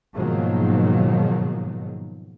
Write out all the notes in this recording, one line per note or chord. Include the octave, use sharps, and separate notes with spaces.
G#2 B2 D#3 F3 F#3 A#3